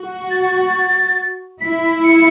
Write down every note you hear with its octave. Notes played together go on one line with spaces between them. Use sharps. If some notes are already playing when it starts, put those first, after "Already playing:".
Already playing: F#4
A6
E4 B6
C#7